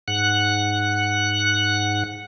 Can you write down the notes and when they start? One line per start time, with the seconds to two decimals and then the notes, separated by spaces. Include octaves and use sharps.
0.08 G#2 F#5 F#6